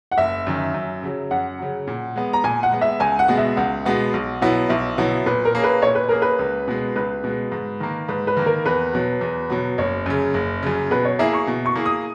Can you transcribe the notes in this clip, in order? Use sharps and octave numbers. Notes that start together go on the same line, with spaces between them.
F#5
F#1 E5
F#2 D#3
F#2
C#3 F#3
F#2 F#5
C#3 F#3
A#2
G#3 B3
A#5
A#2 G#5
F#5
G#3 B3
E5
C#2 G#5
F#5
B2 G#3 B3 F#4
E5
C#2 F#5
B2 G#3 B3 F#4
B1
B2 F#3 B3 E4
B1 E5
B2 F#3 B3 E4
A#2 B4
A#4
A#3 C#4 G#4
B4
A#2 C#5
B4
A#3 C#4 G#4 A#4
B4
C#2
B2 G#3
C#2 B4
B2 G#3
G#2
D#3 A#3
G#2 B4
B4
D#3 A#3
A#4
E2 B4
B2 F#3
E2
B2 F#3
F#1 C#5
F#2 C#3
F#1
F#2 C#3
B2 B4
C#5
A#3 E4 G#4 E5
C#6
B2
C#6
A#3 E4 G#4
D#6